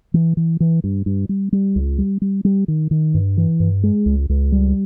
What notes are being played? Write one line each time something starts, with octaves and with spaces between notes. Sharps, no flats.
E3
E3
E3
G2
G2
G3
G3
C#2
G3
G3
G3
D#3
D#3
G2
E3
G2
G#3
C#2
C#2
G3